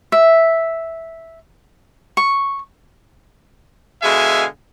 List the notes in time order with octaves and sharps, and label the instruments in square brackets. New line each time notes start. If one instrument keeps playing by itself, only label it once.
[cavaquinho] E5
C#6
[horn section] B2 D3 G#3 E5 F5 G#5